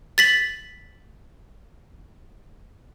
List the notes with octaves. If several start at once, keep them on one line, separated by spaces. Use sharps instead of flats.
A6 B6 F#7